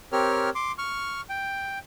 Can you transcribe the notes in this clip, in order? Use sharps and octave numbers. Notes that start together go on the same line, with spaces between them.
C4 G4 A#4 C#5 F6
C6 D6
C#6 F6
G5